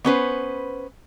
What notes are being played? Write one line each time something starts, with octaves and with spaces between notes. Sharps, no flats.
B3 C#4 B4 C5